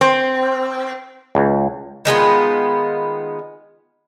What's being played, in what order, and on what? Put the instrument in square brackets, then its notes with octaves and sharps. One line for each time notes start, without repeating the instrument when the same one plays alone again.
[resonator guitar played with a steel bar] C4
[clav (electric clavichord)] C#2
[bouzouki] D#3 G#3 B3 F4